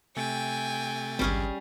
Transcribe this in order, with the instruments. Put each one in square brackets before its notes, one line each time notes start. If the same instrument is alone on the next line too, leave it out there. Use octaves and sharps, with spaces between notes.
[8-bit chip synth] C3 A3 A6 [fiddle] G5 G#5
[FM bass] G#1 [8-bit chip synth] C#2 G2 [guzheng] G3 C#4 G#4